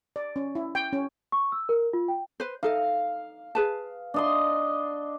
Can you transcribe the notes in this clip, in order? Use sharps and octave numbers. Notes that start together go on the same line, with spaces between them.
D5
C#4
E4
G5
C#4
C#6
E6
A#4
F4
G5
B4 C5
D#4 A4 D#5 F5
G#4 B4 A5
D4 D#5 C6